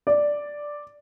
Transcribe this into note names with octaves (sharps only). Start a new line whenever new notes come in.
D5